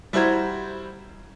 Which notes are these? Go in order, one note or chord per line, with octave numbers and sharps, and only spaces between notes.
G3 E4 F#4 C5 A#5 G#6